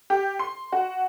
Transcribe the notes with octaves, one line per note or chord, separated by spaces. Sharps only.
G4
C6
F#4